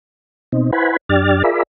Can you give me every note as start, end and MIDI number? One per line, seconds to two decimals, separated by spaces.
0.52 0.71 47
0.52 0.71 60
0.52 0.71 63
0.73 0.97 64
0.73 0.97 71
0.73 0.97 72
0.73 0.97 78
0.73 0.97 80
0.73 0.97 83
1.09 1.43 42
1.09 1.43 62
1.09 1.43 67
1.09 1.43 74
1.09 1.43 89
1.09 1.43 93
1.43 1.63 65
1.43 1.63 68
1.43 1.63 70
1.43 1.63 74
1.43 1.63 76
1.43 1.63 83